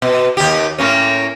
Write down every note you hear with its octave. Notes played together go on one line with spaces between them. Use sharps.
B2
D#2 G4
A2 A#3 C#4